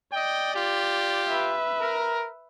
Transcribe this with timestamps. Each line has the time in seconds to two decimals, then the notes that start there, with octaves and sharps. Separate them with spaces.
0.13 D5 D#5 G5
0.55 F4 G4
1.29 B4 E5
1.80 A#4